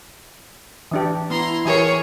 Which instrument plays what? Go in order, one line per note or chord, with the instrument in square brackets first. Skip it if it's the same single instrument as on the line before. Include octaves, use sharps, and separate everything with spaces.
[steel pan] E3 D4 G4
[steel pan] B3 [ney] E4 [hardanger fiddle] A#5 C6
[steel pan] E3 G4 A#4 [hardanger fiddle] G#4 C#5